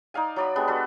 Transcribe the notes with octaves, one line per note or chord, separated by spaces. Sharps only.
D#4 D5 F5 G#5
F#3 D5 B5
G3 G#3 B3 D4
F#4 A4 B4